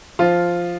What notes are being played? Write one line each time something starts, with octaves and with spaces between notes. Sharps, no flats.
F3 F4